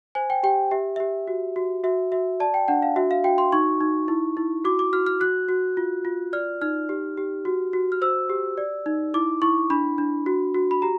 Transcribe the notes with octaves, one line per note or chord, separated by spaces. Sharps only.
C5 G#5
G5
G4 G5
G4 E5
G4 E5
F#4
F#4
F#4 E5
F#4 E5
D5 A5
G5
D4 F#5
F5
F#4 E5
F5
F#4 G5
C6
D#4 C#6
D#4
E4
E4
F#4 D6
D6
F#4 F6
F6
F#4 F#6
F#4
F4
F4
D5 F6
D#4 F6
G4
G4
F#4
F#4
F6
C5 E6
G4
D5
D#4
E4 D6
E4 C#6
D4 B5
D4
F#4
F#4
B5
G4 A#5